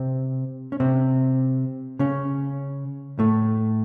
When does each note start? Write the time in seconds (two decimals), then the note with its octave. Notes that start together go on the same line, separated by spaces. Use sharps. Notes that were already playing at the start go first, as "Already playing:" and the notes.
Already playing: C3 C4
0.72 C#4
0.80 C3 C4
1.99 C#3 C#4
3.19 A2 A3